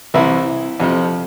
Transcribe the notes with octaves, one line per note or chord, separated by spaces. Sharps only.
C2 C3 E3 E4
F2 C3 F3